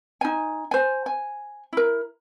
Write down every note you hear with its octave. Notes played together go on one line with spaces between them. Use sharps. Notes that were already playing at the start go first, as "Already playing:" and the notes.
D#4 G#5
C5 G#5
G#5
E4 A#4